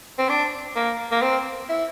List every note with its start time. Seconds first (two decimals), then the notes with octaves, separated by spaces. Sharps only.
0.19 C4
0.29 D4
0.76 A#3
1.12 A#3
1.22 C4
1.69 E4